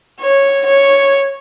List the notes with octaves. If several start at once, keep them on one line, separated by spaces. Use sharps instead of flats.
C#5
C#5